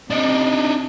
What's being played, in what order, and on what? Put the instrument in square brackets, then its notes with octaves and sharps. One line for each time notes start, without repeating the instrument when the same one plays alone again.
[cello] C3 [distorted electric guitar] D4 D#4